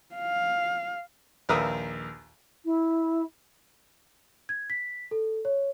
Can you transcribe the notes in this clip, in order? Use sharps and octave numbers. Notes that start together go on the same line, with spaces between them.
F5
A#1 D#2 A#4 B4 E5 D#6
E4
G#6
B6
A4
C#5